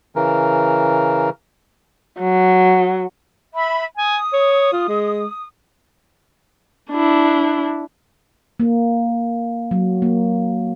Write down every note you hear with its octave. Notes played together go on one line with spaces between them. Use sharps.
C#3 E3 A#4
F#3
E5 B5
G#5 D#6
C#5
F4
G#3
D4 E4
A#3
F#3
A#3